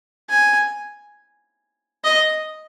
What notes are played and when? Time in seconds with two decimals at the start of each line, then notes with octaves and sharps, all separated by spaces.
0.29 G#5
2.04 D#5